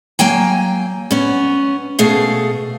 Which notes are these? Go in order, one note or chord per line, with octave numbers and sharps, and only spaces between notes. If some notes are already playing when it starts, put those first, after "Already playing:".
F#3 A#3 G5 G#5
B3 C#4
B2 A3 G#4 F5